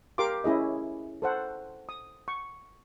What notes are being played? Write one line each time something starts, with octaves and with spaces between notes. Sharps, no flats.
G4 A#4 F5 C6 D6
C#4 E4 G#4 D#5
A4 C5 F#5
D#6
C#6